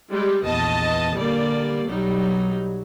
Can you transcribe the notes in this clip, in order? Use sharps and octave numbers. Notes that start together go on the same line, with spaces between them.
G3 G#3 G4
A#1 E2 B3 D#5 A5
D3 G3 A#3 D5
B1 F#3 G3 D#4